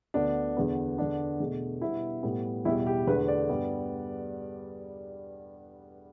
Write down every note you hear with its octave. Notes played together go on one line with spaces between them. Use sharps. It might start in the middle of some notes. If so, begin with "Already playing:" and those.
D2 D3 B3 D4
E2 D3 B3
E2 D3 B3 D4
E2 B2 A3
B2 G3 B3 E4
A2 G3 B3
E2 B2 G3 E4
G4
E2 D3 A3 B4
D5
G2 G3 B3